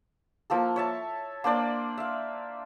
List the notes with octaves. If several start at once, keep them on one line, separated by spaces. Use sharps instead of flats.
F3 A#3 A4
C#5 E5 A5
A#3 D4 C5 D5
E5 F5